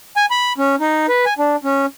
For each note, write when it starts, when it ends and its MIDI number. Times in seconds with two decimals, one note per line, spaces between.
0.16 0.26 80
0.31 0.53 83
0.58 0.76 61
0.80 1.06 63
1.08 1.25 71
1.26 1.34 80
1.39 1.56 62
1.64 1.86 61